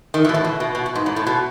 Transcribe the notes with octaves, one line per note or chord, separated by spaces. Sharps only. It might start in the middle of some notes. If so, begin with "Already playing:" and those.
D#3
B2 E3
A2
B2
B2
B2
B2
G#2
A2
A2
B2